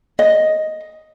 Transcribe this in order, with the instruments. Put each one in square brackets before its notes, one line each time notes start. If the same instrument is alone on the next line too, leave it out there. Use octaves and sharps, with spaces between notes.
[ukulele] D#5